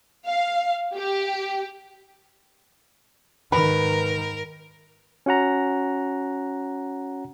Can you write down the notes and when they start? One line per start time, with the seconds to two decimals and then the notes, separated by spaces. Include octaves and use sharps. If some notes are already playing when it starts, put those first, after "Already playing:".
0.25 F5
0.95 G4
3.52 G#2 D#3 A#4 B4 B5
5.26 C#4 F#4 F#5 A#5